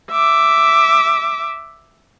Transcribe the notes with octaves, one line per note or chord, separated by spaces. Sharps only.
E5 D6